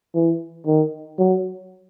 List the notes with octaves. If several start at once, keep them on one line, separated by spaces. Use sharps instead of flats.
E3
D#3
F#3